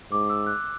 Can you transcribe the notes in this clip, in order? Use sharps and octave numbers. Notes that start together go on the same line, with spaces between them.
G#2 D6
E6
F#6